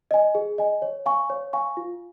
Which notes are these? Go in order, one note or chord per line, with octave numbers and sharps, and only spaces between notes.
D#5 G#5
G#4
D#5 G#5
C#5
F5 G#5 C#6
C#5
F5 G#5 C#6
F4